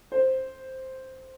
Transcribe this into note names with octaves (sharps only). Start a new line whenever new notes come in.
C5